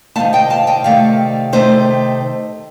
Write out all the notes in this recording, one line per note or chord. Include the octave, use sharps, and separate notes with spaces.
C3 D#3 A3 F5 A5
D#5 G5
F5 A5
D#5 G5
C3 D#3 A3 D5 F5
C3 D#3 A3 C5 D#5